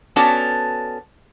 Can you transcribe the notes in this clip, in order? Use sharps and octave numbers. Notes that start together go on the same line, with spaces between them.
B3 C#4 F#4 A4 D5 A5